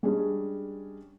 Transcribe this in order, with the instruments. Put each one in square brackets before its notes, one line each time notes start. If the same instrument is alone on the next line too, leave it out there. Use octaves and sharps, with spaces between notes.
[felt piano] G3 G#3 C#4 D4 G#4